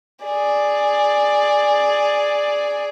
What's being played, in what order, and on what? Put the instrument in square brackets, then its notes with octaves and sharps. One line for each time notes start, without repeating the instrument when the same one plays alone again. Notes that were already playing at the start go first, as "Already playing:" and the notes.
[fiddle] G#4 D5